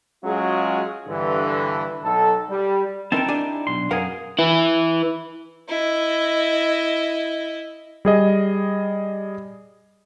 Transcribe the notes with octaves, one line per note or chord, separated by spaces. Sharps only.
F#3 G#3 C#4 F4 F#4 G#4
G2 D3 E3
B1 A4
G3
C4 D#4 E4 A#4 G5 A5
D4 G4 G#5
B1 C6
F#2 G#4 A#4 F5 F#5
E4 B4
E4 D#5
G3 G#4 D#5